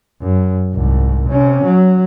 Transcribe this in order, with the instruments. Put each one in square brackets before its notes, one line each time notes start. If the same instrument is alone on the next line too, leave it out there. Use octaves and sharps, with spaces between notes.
[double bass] F#2
C2 G#2
C3 C#4
F#3